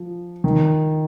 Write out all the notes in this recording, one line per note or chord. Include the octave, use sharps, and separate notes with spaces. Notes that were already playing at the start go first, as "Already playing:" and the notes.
Already playing: F3
D#3